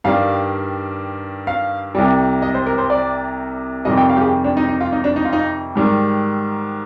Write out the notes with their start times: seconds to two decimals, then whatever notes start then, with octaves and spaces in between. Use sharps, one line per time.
0.04 G2 D#3 G3 F5
1.47 F5
1.95 C2 C3 G3
2.42 D#5
2.54 C5
2.66 A#4
2.78 C5
2.90 D5
3.85 F2 C3 D#3 G3 D#5
3.97 G5
4.09 F5
4.17 G4
4.21 G#4
4.44 D4
4.57 D#4
4.68 D#4
4.80 F4
4.92 D#4
5.04 D4
5.16 D#4
5.25 F4
5.33 D#4
5.76 G#2 D#3 G3